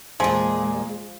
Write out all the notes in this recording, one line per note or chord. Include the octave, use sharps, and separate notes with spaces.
E2 A#2 F3 G#3 G#4 G#5